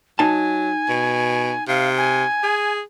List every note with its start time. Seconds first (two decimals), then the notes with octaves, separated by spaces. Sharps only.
0.19 F#3 D#4 G#5 A5
0.89 B2
1.68 C3 F5
1.97 G#5
2.43 G#4